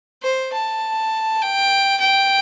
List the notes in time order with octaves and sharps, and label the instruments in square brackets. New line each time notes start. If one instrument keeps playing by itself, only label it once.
[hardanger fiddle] C5
A5
G5
G5